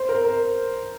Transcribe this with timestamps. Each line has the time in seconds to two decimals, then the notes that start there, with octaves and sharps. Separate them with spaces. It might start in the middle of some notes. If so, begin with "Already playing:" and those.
Already playing: C5
0.09 A#4
0.24 A#4